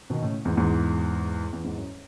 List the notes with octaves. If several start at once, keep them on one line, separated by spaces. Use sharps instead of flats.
B2 D#3
A2 C#3
E2 G#2
E2 G#2
E2
E2 G#2
F#2